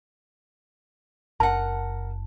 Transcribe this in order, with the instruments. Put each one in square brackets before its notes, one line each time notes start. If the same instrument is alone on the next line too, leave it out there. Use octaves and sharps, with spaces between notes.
[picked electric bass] F#1 [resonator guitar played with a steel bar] A#4 F#5 [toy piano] A5